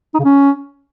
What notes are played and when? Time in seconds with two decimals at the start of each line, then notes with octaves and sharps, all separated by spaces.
0.14 D#4
0.19 C#3
0.24 C#4